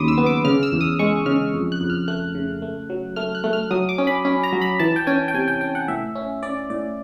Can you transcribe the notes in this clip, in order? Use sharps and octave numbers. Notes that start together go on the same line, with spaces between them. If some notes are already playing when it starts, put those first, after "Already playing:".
Already playing: D#2 C#3 F#3 B5 C6 D6 D#6
E6
B3
D6
C#3 F6
E6
E2
D#6
G#3 C#6
C#3 F6
F2
F#6
F2
F6
A3 F#6
C#3
A3
F#3
A3 F6
F#6
A3
F6
F#3 D#6
D6
C#4
B5
C#4
A#5
F#3
B5
E3 A5
G5
C#4 G#5
G5
C3 G#5
G5
C#4 G5
F#5
A2 E5
C#4
C#4 D5
A2 D5